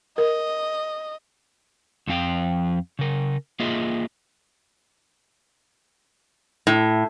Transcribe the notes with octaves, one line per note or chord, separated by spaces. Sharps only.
A#4 D#5
F2 F3 C4 F5 G5
C#3 A#4
A#3 F4 G#4 D#5 E5
A2